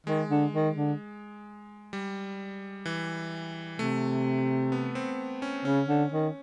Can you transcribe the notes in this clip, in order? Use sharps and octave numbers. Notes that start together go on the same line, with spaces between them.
D#3 G#3
D3
D#3
D3
G3
E3
C3 A3
B3
C4
C#4
C#3 C#4
D3
D#3